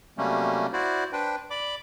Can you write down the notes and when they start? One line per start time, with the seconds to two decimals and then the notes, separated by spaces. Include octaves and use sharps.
0.18 C3 F#3 G3 A3 A#3 C#4
0.73 E4 F#4 C5 D5
1.13 D4 B4 C5 G5
1.50 D5 B5 D6